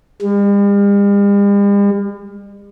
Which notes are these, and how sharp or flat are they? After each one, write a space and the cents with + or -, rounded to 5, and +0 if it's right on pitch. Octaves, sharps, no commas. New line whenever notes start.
G3 +45